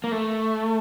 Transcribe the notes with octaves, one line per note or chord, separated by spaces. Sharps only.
A#3
A3